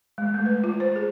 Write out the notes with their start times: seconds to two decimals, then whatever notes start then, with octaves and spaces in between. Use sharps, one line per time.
0.18 G#3
0.34 A3
0.46 B4
0.64 F4
0.80 C5
0.96 G#4